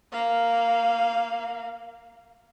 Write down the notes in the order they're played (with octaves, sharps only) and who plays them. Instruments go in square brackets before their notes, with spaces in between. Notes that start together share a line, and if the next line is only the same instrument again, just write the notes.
[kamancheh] A#3 F5